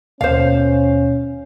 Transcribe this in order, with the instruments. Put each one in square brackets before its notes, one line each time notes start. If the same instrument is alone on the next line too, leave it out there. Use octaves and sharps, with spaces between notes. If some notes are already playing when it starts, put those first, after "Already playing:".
[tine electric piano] D#2 B2 [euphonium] C#4 [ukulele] C5 F5